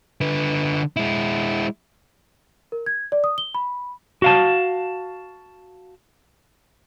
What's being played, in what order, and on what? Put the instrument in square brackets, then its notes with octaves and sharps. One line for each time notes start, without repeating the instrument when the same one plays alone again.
[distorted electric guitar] D3 B4
G#3 E4
[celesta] A#4
G#6
D5
D#6
G7
B5
[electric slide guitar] F#4 F5 A5